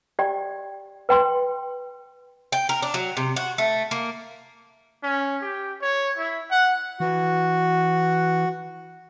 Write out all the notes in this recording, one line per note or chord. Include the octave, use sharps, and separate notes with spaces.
G4 D5 G5
B4 G5 C6
G5
A#4
D4
F#3
C3
F#4
A3
A#3
C#4
G4
C#5
E4
F#5
E3 F#4